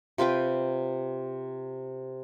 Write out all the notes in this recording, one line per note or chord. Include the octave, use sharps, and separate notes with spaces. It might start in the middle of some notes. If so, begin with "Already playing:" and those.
C3 F4 B4 G5